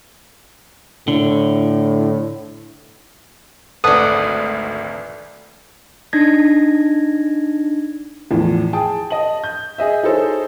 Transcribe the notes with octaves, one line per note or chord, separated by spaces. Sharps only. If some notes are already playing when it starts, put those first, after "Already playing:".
A2 D3
G#1 D2 A4 B4 D5 F#5 A5 D#6
D4 D#4 G#6 A#6
E2 A2 E3 F3
G#4 G5 A5 D#6
D#5 A5 F#7
G6
G#4 D#5 E5
D#4 E4 G#4 A4 C5 C#5